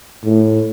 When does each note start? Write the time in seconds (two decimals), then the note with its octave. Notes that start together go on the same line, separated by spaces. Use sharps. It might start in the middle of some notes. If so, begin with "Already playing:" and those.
0.24 A2